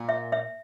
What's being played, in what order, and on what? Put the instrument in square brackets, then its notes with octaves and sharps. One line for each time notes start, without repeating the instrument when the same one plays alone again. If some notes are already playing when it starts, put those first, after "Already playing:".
Already playing: [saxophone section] A#2
[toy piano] E5
E5